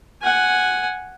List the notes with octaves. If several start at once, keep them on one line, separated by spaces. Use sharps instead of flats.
F#5 G#5